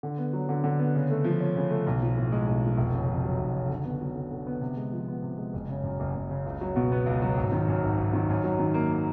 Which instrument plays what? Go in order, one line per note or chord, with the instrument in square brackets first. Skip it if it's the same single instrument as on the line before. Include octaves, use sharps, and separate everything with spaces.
[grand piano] D3
B3
F#3
D3
D3
B3
C#3
A3
F3
C#4
C#3
A3
B1
F3
A2
G#3
B1
F3
F1
C#3
F2
F#3
F1
C#3
D3
B3
F#3
D3
D3
B3
C3
G#3
F3
B3
C3
G#3
F#1
C#3
F#2
F#1
F#1
C#3
C#2
F#3
B2
B3
C#2
F#3
G#1
D#3
F#2
G#1
G#1
D#3
F#2
F#3
D#3
A#3